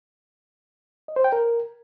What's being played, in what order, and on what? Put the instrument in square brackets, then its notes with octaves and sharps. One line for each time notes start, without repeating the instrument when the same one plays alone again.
[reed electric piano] D#5
C5
G5
A#4